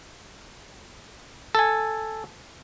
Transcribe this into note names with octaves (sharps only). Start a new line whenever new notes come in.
A4 G#5